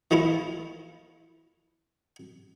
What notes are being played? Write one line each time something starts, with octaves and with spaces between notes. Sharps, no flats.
E3 F3 A3 E4 F4